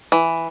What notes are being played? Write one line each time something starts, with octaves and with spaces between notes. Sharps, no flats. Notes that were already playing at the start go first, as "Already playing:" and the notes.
E3